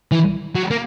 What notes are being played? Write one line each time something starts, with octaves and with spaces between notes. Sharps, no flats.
E3
F#3
A#3